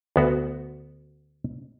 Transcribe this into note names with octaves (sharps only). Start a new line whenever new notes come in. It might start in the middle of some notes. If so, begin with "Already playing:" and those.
D2 B3 F#4